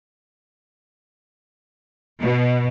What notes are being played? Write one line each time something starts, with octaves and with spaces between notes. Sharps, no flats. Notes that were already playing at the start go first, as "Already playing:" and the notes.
B2